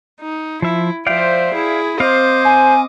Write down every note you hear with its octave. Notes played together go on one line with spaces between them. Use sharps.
D#4
F3 E4 E5
F3 C5 D5 E5 F5 G5
E4 G#4
C4 C5 D#5 F5 D6
G#5